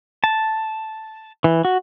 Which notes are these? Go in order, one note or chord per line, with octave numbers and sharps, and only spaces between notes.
A5
E3
F#4